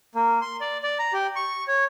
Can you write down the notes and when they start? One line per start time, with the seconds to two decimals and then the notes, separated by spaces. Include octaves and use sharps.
0.15 A#3
0.42 C6
0.61 D5
0.83 D5
0.99 A#5
1.13 G4
1.36 C#6
1.68 C#5